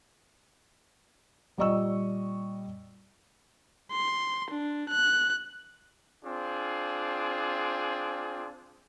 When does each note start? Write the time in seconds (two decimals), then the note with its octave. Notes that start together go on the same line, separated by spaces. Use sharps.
1.58 A#2 G3 D5 D#5 C#6 E6
3.91 C6
4.51 D4
4.89 F#6
6.24 C4 D4 F4 G#4